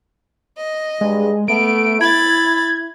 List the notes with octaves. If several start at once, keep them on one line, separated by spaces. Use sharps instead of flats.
D#5
G2 G#3
A3 B3 D7
E4 B5 G#6 A6